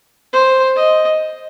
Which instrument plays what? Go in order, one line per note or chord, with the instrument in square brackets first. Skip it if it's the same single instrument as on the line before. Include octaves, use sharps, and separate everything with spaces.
[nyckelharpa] C5
D#5